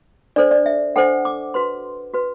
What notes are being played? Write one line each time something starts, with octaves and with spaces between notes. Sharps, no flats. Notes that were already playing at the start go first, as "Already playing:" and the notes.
D4 A4 C5 D5
D5
E5
D4 A4 C5 F#5
D6
F#4 B4 C6
F#4 B4